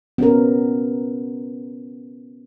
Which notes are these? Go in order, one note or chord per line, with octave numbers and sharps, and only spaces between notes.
B3 C#4 A#4